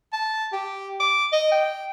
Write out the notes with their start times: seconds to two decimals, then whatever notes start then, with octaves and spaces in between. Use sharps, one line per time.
0.13 A5
0.53 G4
1.00 D6
1.32 D#5
1.52 G5